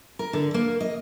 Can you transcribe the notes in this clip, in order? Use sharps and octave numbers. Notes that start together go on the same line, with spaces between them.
A#4
D3
A#3
D#5